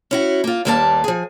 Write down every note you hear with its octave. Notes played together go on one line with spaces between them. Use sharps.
C#4 E4 F#4
A#3 F4
D#2 G3 A#3 B4 C#5 A5
F3 G#4